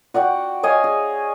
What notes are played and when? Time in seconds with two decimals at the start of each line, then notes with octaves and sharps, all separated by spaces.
0.14 F#4 D5 F#5 G5
0.63 C#5 D#5 F5 G#5
0.84 G#4